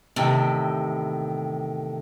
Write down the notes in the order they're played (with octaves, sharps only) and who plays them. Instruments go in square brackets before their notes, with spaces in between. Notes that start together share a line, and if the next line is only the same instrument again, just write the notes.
[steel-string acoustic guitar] E2 A2 C3 D#3